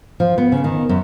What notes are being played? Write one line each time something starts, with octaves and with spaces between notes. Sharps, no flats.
F3
B3
C#3
D#3
F#2